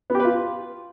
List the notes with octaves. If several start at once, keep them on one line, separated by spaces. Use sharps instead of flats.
B3
G4
B4
F4